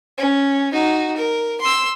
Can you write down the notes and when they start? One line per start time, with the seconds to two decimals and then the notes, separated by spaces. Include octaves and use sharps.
0.18 C#4
0.73 D#4 F#4
1.17 A#4
1.61 C6 E6